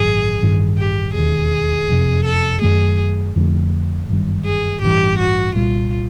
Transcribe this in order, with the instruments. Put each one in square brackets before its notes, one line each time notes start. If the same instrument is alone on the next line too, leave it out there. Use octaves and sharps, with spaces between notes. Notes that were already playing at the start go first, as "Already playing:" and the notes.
Already playing: [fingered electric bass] A1 G2 D#3 F#3 [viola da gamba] G#4
[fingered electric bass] A1 G2 D#3 G3
[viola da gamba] G4
[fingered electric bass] E1 D#2 D#3 [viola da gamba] G#4
[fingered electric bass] F#1 F2 C3
[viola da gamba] A4
[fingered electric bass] F#2 D#3 F#3 A3 [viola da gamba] G#4
[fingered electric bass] F2 D3 F3 A3
G1 F#2 D#3 G3
[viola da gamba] G#4
[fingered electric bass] A1 G2 E3 [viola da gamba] G4
[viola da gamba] F#4
[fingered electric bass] C2 A#2 G3 [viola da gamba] F4